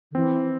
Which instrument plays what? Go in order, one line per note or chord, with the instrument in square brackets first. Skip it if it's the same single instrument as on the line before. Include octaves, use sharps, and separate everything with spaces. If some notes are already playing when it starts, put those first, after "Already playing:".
[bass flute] D3
[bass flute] E3 [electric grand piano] C4